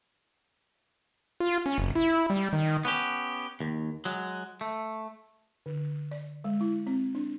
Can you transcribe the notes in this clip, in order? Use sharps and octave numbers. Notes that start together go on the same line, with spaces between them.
F4
C#4
F#1
E4
G3
D#3
B3 C#4 G4
D#2
F#3 G#3
A3
D3
D5
G#3
E4
C4
D4